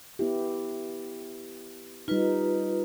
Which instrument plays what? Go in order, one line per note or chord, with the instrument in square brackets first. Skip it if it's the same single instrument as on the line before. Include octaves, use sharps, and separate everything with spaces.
[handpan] B3 E4 G4
[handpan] G3 D#4 [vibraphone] F4 B4